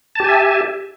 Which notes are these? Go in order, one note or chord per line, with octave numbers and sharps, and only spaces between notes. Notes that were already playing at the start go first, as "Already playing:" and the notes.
G4 E5 G#5 A5